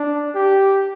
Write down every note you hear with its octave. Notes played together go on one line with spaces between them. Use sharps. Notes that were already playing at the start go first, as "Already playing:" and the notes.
Already playing: D4
G4